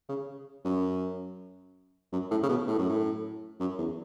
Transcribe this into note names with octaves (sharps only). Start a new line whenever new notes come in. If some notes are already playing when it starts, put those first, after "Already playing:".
C#3
F#2
F#2
A2
C#3
B2
A2
F#2
A2
F#2
E2